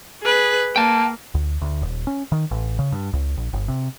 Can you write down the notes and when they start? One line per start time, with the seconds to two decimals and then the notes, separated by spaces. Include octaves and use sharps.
0.22 G#4 B4
0.76 A#3 G5 A5
1.34 D2
1.61 D2
1.82 D#1
2.07 C#4
2.32 D#3
2.51 A1
2.79 C#3
2.92 G2
3.13 C#2
3.37 A#1
3.53 G1
3.68 C3